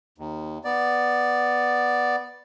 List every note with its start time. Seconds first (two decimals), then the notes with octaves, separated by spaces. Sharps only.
0.18 D#2
0.64 B3 D5